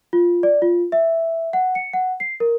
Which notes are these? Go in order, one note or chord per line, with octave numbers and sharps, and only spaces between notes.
F4
D5
F4
E5
F#5
C#7
F#5
C7
A#4